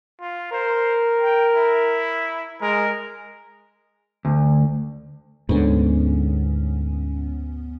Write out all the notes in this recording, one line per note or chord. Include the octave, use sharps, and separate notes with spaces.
F4
A#4 C5
G5
E4
G#3 A#4
D2
D2 G#2 D3 B3 C#4